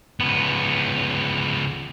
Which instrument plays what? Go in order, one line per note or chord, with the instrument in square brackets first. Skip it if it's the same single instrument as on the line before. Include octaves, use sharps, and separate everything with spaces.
[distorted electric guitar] C#2 B3